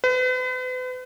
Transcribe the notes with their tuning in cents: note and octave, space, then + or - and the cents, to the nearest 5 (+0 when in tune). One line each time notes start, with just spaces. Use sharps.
B4 +40